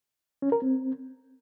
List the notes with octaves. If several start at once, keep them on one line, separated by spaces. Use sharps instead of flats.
C#4
A#4
C4